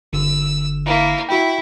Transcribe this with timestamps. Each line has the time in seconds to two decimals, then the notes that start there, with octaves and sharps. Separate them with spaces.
0.13 G1 D3 E6
0.86 A#3 E4
1.29 E4 F#4 E5 G5